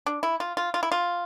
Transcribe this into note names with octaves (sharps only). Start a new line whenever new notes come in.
D4
E4
F4
F4
F4
E4
F4